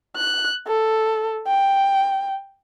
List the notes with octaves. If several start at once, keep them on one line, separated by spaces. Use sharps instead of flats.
F#6
A4
G5